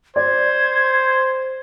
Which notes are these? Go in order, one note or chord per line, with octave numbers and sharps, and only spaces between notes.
C5 D5 G#6